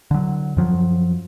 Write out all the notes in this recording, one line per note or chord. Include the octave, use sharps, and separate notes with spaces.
D3 F#3
F#2 F3 F#3